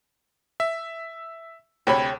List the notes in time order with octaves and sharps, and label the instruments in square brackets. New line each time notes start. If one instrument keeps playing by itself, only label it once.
[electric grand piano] E5
[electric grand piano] D2 C3 B5 [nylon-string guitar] G#4 C#5 G5